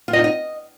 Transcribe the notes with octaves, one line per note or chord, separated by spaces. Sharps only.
F4
D#5
D#4
D#5